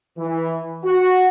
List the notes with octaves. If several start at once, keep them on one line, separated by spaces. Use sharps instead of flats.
E3
F#4